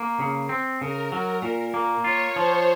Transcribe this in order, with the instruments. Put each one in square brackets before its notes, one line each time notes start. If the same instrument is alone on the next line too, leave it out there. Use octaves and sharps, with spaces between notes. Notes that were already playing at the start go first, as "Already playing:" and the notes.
Already playing: [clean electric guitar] A#3
C#3
C4
[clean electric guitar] C#3 [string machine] A#4
[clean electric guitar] F#3
A#2
A#3
[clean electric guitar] F4 [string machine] C#5
[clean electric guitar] F3 [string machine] C5